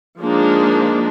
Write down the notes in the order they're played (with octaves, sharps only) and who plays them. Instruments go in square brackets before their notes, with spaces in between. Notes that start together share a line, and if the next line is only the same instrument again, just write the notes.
[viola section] F3 G#3 A#3 D4 D#4